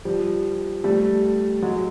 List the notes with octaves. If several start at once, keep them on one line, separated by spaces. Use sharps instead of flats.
F3 G3
G3 A3
F#3 G#3